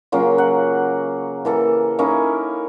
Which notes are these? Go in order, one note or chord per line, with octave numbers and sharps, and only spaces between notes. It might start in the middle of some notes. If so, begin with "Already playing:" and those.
C#3 F#3 A#3 F4
F#5
E3 A#3 A4
A#3 C#4 D#4 E4